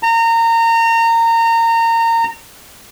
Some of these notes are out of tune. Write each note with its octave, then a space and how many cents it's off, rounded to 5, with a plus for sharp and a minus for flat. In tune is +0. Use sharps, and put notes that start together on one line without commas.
A#5 -25